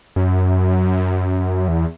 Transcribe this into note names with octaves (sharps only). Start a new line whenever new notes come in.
F#2
E2